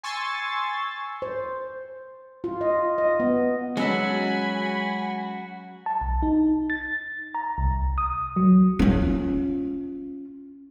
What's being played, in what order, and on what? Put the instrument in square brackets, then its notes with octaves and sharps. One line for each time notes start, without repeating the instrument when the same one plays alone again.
[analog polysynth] G#5 C6 C#6 E6 A6
[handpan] C5
F4
D#5
D#5
B3
[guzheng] F#3 E5 A5 [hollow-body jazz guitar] G#3 C#4 [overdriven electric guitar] F#4 [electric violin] G#5 B5
[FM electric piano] A5
B1
D#4
A6
A#5
C2
D#6
F#3
[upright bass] C#4 F4